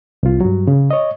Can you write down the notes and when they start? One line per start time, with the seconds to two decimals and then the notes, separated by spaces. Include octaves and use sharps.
0.23 C2 F4
0.41 G2 F#3
0.67 C#3
0.91 C#5 D#5